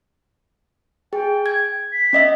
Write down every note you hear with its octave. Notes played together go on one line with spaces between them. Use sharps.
G#4 G5
G#6
B6
C#4 D#5 E5